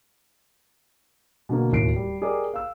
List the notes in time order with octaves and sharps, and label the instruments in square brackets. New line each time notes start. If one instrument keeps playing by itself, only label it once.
[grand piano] B2 D3 A#3
D1 D#2 D#3 E4 C7 D7
G3
G4 G#4 A#4 D5 D#5 D6
F5 E6